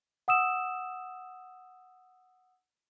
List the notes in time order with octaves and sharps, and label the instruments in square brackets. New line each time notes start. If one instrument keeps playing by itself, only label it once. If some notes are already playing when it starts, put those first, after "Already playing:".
[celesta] F#5 D#6 E6 E7